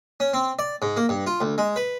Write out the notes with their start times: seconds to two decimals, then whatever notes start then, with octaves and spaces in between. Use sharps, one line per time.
0.20 C#4
0.34 C4
0.59 D5
0.82 G#2
0.97 A#3
1.09 G2
1.27 F4
1.41 D2
1.58 G#3
1.76 B4